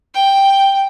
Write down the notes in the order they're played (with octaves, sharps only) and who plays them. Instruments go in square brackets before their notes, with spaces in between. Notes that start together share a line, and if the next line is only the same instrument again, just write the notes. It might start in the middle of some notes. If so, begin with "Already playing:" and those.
[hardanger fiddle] G5